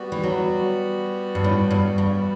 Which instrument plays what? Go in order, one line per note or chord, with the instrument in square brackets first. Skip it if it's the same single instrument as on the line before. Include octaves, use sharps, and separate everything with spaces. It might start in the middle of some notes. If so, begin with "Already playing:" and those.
Already playing: [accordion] G3 B3 F#4
[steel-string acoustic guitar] E3
F#3
G2
A2
G2
G2